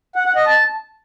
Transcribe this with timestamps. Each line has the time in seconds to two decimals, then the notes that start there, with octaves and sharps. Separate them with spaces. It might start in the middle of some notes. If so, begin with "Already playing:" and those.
0.15 F#5
0.26 F#5
0.36 D#5
0.46 A5